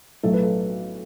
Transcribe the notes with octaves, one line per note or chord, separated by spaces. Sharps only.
B1 A2 F#3 A3 A4
B4
A4